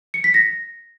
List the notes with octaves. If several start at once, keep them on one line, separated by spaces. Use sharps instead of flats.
C#7
B6
A#6